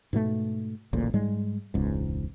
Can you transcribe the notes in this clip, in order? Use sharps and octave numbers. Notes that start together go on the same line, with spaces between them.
G#2 B2 A3
D#1 A1 D2 A#2
G#2 G3 G#3
E1 C#2 G#2